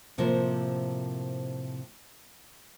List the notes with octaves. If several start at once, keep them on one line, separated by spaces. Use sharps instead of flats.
A2 C3 F3 A#3 A#4 C5